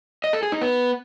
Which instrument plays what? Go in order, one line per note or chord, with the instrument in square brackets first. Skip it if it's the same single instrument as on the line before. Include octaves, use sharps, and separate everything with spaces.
[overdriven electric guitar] D#5
A4
G#4
D#4
B3